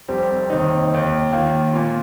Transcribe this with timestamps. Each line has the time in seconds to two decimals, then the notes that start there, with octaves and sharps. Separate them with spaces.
0.08 F1 F2 C3 G3 C4
0.50 F1 D#2 D#3 C4 D#4
0.91 D#2 D#3 A#3
1.32 D#2 D#3 A#3 F4
1.73 A#2 A#3 F4